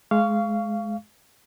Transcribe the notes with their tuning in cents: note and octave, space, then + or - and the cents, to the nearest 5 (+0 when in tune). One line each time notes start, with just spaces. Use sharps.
G#3 +25 F5 -15 C#6 +25